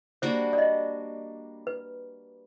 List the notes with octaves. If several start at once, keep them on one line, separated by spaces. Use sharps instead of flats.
G3 A#3 D4 F#4 C5
D5
D#5
B4